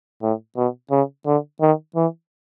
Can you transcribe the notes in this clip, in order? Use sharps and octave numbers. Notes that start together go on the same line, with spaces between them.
A2
B2
C#3
D3
D#3
E3